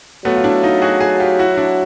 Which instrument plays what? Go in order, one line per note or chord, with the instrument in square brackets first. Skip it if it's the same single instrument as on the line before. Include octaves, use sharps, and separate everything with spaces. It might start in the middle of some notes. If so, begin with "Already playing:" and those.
[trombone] F#3 [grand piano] A3 B3
[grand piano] F4
D4 E4
D#4 F4
F#4 G#4
F#4 G#4
F4 G4
E4 F#4
D4 E4